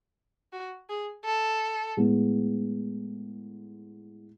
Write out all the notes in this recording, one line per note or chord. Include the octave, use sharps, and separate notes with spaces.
F#4
G#4
A4
A2 G#3 B3